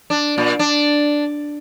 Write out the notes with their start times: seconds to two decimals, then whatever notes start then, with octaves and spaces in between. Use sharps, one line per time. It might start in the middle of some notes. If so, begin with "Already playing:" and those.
0.10 D4
0.38 A#2
0.59 D4